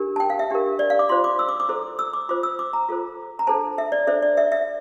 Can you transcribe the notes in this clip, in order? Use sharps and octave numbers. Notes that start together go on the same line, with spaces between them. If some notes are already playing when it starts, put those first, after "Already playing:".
Already playing: D4 G4 A#4
A5
G5
F5
E5
D4 G4 A#4
D5
F5
D6
F4 C5 C6
D6
E6
D6
D6
E4 A4 C5
E6
D6
F4 C5 D6
E6
D6
A#5
F4 A4 C5
A#5
D4 A4 C5 A5
E5
D5
D4 A4 C5 E5
D5
E5
E5